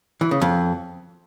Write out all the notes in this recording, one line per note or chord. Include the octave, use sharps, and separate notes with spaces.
E3
C#3
F2